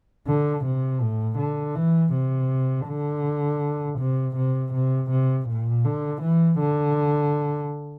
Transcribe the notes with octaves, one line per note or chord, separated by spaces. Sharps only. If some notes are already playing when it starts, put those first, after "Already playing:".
D3
C3
A2
D3
E3
C3
D3
C3
C3
C3
C3
A#2
D3
E3
D3